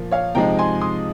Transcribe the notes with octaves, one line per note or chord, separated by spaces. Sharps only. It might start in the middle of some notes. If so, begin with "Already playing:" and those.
Already playing: A#2 F3 A#3
C#5 F5
C3 F3 G#3 D#4 G5 A#5
G#5 C6
C6 D#6